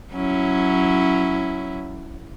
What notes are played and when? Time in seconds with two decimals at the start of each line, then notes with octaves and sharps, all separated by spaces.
0.13 F#3 C#4 E4